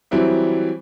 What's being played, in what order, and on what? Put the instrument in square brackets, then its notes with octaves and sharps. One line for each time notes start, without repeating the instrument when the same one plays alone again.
[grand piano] E3 F#3 G3 C4 E4